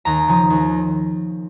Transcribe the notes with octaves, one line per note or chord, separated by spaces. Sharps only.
D#2 A#5
C#3 F3
D#2